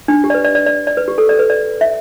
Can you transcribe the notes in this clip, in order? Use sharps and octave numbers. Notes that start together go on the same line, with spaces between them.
D4
G4
D5
B4
D5
D5
D5
D5
B4
G4
A4
D5
B4
D5
E5